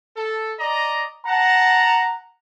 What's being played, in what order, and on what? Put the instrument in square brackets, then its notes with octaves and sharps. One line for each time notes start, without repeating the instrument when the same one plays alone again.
[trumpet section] A4
D5 D#5 A#5
[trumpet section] F#5 A5 [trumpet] A#5